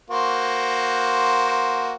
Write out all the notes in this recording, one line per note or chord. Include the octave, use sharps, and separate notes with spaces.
A#3 F#4 C5